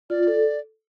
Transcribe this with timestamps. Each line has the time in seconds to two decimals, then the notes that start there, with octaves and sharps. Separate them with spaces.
0.09 F4 D5
0.27 A4